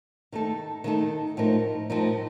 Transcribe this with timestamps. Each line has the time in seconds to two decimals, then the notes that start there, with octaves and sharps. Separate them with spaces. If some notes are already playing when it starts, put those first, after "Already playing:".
0.32 D#3 A3 D#4 A4
0.84 D#3 A3 D#4 A4
1.37 A2 F3 A3 D#4 A#4
1.90 A2 F3 A3 D#4 A#4